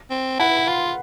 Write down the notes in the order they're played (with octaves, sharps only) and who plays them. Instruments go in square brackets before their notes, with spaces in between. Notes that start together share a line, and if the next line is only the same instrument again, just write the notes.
[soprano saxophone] C4
[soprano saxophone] E4 [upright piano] F#5
[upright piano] B5
[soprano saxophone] F4 [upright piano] C6